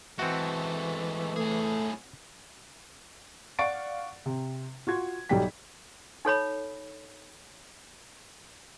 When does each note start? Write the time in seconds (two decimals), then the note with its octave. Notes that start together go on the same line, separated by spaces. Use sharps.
0.19 E3 G#3 A3 C4 F#4
1.36 A2 A3 G#4
3.59 D5 F5 F#5 C#6 A6 D7
4.26 C3
4.87 F4 F#4 G#6
5.29 B1 F#3 G3 G4 G5 B6
6.25 D#4 A4 C#5 B5